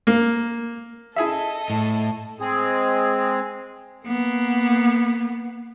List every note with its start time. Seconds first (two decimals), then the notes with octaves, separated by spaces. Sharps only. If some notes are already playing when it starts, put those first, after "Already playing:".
0.07 A#3
1.16 E4 G#4 A4 D#5 E5
1.70 A2
2.40 G#3 C4 G#4
4.05 A#3 B3